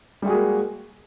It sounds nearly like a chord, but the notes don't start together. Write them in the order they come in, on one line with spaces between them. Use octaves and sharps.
G3 G#3 F#4 G#4 A#3